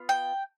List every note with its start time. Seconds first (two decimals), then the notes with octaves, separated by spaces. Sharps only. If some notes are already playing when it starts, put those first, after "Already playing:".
Already playing: B3 F4
0.09 G5